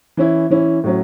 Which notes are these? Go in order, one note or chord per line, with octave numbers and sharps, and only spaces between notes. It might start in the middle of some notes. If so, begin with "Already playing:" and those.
E3 C#4 E4
E3 C#4 E4
A2 F#3 C#4